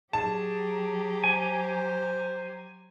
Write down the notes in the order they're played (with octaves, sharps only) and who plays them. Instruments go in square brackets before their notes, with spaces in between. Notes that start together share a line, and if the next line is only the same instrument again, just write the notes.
[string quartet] F#3 G4 A#5 [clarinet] G#4 [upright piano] A5
[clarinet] C5 [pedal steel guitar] G#5